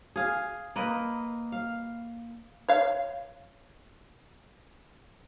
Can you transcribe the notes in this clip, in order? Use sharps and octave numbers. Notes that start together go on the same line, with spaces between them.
G#4 F5
A#3 B4 D#5
F5
C#5 F5